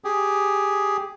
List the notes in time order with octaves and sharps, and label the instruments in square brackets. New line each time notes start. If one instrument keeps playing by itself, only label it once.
[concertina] G4 G#4